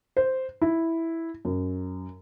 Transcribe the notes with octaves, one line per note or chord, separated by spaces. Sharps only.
C5
E4
F#2